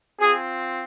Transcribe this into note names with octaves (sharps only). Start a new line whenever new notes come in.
C4 F4 G#4